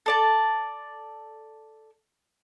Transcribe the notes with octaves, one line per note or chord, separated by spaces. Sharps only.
A4 D5 A5